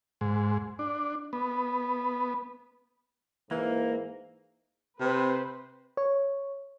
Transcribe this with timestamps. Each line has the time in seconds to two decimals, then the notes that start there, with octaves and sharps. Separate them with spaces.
0.21 G#2
0.79 D4
1.33 B3
3.51 G#2 E3 A#3
5.00 C3 B4 C5
5.97 C#5